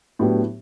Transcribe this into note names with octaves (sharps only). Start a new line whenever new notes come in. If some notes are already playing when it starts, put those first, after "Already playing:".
A2 F#3 B3 D4 G4